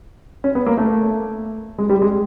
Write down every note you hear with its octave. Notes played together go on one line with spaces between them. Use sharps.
C#4
B3
A#3
A3
G#3
G3
G#3